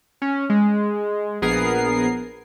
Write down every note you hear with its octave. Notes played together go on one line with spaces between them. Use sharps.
C#4
G#3
A#1 B3 G#4 A#4 C7